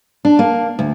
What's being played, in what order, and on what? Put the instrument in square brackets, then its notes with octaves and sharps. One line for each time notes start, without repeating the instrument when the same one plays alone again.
[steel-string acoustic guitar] D4
A#3
D2